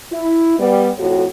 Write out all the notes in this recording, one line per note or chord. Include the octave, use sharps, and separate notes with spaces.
E4
G3 B3
F2 A2 F#4 C#5